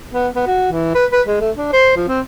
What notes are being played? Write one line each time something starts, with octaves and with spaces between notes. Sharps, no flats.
B3
B3
F#4
E3
B4
B4
G#3
A3
D4
C5
F3
C4